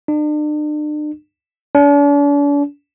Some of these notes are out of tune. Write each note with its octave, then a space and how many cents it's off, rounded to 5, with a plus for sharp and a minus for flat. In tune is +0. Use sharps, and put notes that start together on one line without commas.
D4 +40
D4 -45